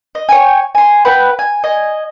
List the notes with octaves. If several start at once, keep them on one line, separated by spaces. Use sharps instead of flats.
D#5
C#5 G5 G#5
G#5 C6
B4 F#5 G5
G#5
D#5 G#5